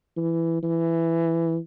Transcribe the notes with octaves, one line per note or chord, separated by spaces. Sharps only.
E3
E3